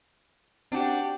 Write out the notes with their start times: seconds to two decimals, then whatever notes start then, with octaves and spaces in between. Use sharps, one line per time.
0.72 C4 D4 F#4 G4